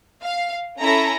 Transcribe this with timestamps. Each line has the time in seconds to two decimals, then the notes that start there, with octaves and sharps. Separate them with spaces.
0.22 F5
0.80 C#4 E4 A4 A#5